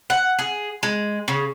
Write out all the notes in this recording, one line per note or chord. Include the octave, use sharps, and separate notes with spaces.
F#5
G#4
G#3
C#3